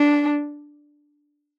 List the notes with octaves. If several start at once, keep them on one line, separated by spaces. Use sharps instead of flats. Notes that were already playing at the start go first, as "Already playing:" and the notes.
Already playing: D4